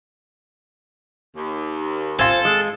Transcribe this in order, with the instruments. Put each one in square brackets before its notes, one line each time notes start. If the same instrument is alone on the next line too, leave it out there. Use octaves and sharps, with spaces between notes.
[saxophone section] D#2
[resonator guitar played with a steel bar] C4 [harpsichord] F4 G#5 [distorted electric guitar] A4
[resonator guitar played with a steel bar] G#3